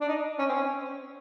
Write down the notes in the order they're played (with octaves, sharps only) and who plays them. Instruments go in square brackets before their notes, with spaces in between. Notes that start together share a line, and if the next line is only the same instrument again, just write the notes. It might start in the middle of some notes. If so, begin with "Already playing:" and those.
[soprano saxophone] D4
D#4
C#4
C4
C#4